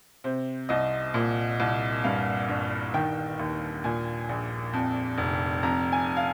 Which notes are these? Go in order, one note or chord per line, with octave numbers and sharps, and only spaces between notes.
C3 C5
C2 D#5
A#2
C2
G2 F5
G1
D#3 G5
D#2
A#2 G#5
A#1
F2
F1
F2 A#5
G#5
F5